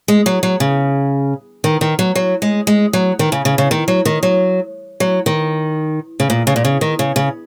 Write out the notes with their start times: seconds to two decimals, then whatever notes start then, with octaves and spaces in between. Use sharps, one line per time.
0.08 G#3
0.26 F#3
0.43 F#3
0.60 C#3
1.64 D#3
1.81 D#3
1.99 F#3
2.15 F#3
2.42 G#3
2.67 G#3
2.93 F#3
3.19 D#3
3.32 C#3
3.45 C#3
3.58 C#3
3.71 D#3
3.88 F#3
4.05 D#3
4.23 F#3
5.00 F#3
5.26 D#3
6.20 C#3
6.30 A#2
6.47 C#3
6.56 A#2
6.65 C#3
6.81 D#3
6.99 C#3
7.16 C#3